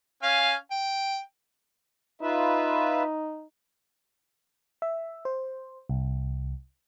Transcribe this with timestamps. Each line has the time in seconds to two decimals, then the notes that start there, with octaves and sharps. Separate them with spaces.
0.23 C#4 F5 G#5
0.71 G5
2.22 D#4 F4 B4 E5
4.82 E5
5.25 C5
5.89 C2